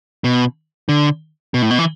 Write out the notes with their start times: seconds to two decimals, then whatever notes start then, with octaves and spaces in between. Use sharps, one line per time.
0.24 B2
0.89 D3
1.54 B2
1.62 A2
1.70 B2
1.79 E3